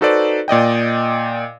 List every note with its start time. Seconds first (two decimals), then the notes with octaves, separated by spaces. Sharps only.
0.01 D#4 F#4 A4 B4 C5 D5
0.48 A#2 D5 D#5 G5